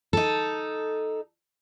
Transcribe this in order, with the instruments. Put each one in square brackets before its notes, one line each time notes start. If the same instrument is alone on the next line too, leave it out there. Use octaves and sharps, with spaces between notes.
[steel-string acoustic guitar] D#4 A4